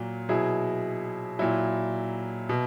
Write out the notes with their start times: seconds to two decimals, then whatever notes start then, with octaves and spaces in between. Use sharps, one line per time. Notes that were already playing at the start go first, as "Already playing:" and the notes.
Already playing: A#2 F#3
0.29 B2 F#3 E4 G#4
1.39 A#2 F#3 E4
2.49 B2